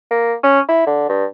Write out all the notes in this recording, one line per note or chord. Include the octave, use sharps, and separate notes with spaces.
A#3
C#4
E4
D3
G2